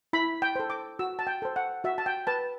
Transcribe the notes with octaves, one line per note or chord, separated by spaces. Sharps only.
E4 B5
G5
A4 C5
D6
F#4 E6
A5
G5
A4 C5
F#5
F#4 E5
A5
G5
B4 A5